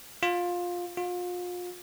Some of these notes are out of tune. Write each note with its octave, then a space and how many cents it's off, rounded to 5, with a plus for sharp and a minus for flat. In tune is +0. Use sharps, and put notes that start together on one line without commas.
F4 +15
F4 +35